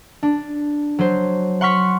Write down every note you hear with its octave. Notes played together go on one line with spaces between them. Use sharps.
D4
F#3 C5
F#5 C6 C#6 F6 B6